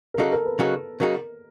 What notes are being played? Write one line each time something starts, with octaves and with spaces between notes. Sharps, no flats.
A#4
C#3 F#3 A#3 D#4 F#4 A4
A#4
B4
C#3 F#3 A#3 D#4 F#4
C#3 F#3 A#3 D#4 F#4 A#4